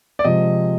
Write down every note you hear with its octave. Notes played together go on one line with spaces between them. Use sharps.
D5
C3 F3 G#3 D#5